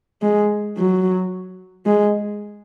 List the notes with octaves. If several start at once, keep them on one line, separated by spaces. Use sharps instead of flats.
G#3
F#3
G#3